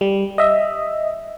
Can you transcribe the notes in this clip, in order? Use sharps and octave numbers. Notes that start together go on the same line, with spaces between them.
G3
D#5 E5